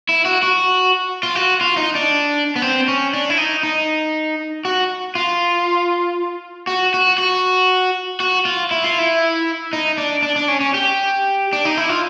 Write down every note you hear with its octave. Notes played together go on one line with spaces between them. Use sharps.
E4
F#4
F#4
F4
F#4
F4
D#4
D4
B3
C4
C#4
D4
E4
D#4
D#4
F#4
F4
F#4
F#4
F#4
F#4
F4
E4
F4
E4
D#4
D4
D4
D4
C#4
C#4
G4
D4
D#4
E4
F4